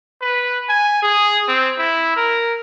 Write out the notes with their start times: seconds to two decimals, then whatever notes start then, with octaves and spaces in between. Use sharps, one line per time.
0.22 B4
0.69 G#5
1.02 G#4
1.48 C4
1.78 E4
2.16 A#4